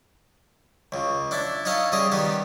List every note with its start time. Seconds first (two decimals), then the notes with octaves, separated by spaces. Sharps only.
0.92 C#2 C#3
1.31 D4 E4 D5
1.65 D#4 E4 C#5 D#5 F5 A5
1.92 C#3 G3 G#4 D#5
2.12 D#3 G3 B3 G4